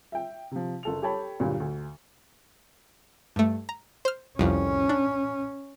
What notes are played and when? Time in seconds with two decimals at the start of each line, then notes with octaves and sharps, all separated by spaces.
0.12 E5 G5
0.51 C3 F3
0.83 F#1 A4 F7
1.02 G4 A4 C#5 G5 A5 B5
1.40 D2 G2 A#2 F#3 G3
1.60 D2
3.36 G2 A3
3.69 A#5
4.05 C5 F6
4.39 C2 F2 C#4
4.89 D4